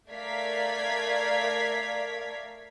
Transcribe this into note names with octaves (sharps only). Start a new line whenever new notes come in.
A3 A#4 D5 F5 G#6 B6